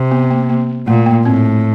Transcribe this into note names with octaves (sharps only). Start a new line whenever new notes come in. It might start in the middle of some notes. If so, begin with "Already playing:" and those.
Already playing: C3
B3
A#3
A#3
A#2 A3
A#3
A2 C4